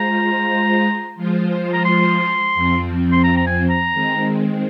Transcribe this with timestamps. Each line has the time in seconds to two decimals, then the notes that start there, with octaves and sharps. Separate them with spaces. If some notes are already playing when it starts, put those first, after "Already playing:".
Already playing: G#3 F4 C5 A#5
1.16 F3 G#3 F4 C5
1.74 A#5
1.85 C6
2.55 F2 F3 C4
3.12 C6
3.24 A#5
3.37 A#5
3.47 G#5
3.69 A#5
3.93 D#3 G#3 C4